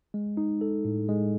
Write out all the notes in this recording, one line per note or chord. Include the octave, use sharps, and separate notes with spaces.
G#3
D#4
A4
A2
G#3